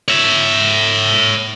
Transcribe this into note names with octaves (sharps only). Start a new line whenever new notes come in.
C#5 E5